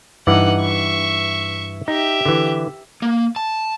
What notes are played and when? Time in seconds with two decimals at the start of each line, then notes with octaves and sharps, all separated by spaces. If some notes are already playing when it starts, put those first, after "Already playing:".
0.27 G2 E3 D#4 D5 F#5
0.61 E5 C#6
1.88 D#4 G4 E5
2.25 D3 E3
3.02 A#3
3.36 A5